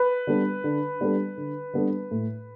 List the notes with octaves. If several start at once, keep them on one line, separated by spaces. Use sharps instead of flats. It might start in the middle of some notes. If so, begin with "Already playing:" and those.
Already playing: B4
G3 B3 D4 A4
D3
G3 B3 D4 A4
D3
G3 B3 D4 A4
A2